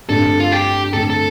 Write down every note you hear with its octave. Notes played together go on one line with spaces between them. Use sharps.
G2 D3 A3 C4 A4
F4
G4
G2 D3 A3 C4 A4
A4